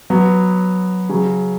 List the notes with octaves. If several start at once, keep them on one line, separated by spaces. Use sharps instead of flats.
F#3 B3
C#3 F#3